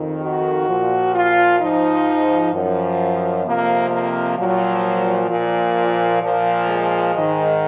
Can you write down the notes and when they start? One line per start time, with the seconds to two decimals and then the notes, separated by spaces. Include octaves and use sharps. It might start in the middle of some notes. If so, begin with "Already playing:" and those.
Already playing: F2 D#3
0.22 F#4
0.68 A#2 F3
1.15 F4
1.61 G#2 F3 D#4
2.54 F#2 F3
3.45 F2 C3 F3 A#3
3.91 A#3
4.37 A#2 F3 F#3
5.30 A#2 F3
6.22 A#2 F3
6.68 G#3
7.14 G#2 D#3